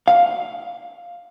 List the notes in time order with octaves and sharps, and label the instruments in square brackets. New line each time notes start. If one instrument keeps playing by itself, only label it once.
[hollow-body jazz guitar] F5